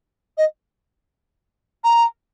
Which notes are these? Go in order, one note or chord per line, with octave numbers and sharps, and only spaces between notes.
D#5
A#5